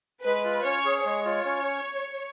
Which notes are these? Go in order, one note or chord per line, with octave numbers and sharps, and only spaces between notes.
G#3 B4
F4
C#4 C#5
G#4
G#3 C#5
F4
C#4